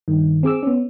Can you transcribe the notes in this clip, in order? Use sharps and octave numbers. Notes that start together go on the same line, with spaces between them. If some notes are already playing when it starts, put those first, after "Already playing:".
G2 D#3
C4 G#4 D6 E6
B3 C#4